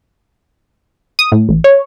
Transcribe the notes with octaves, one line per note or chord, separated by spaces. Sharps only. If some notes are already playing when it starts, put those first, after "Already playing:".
D#6
A2
A1
C#5